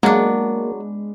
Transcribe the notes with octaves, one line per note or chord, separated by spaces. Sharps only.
F#3 G#3 A#3 B3 D4